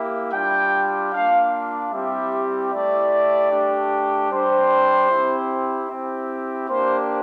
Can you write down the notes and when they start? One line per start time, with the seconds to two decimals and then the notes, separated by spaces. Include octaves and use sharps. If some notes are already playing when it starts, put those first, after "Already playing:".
Already playing: A#3 E4 G4
0.33 G3 D4 F4 G5
1.13 A#3 D4 F4 F5
1.92 G3 C4 E4 G4 E5
2.72 A3 E4 G4 D5
3.51 A3 D4 G4
4.30 G3 D4 G4 C5
5.10 C4 E4 G4
5.89 C4 E4 G4
6.69 A#3 D4 G4 C5